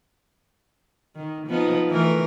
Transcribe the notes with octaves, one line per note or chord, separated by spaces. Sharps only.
D#3
F3 B3 D#4
E3 A3 A#4